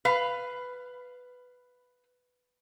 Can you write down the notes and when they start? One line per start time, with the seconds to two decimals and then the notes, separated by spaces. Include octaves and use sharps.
0.05 B4 F5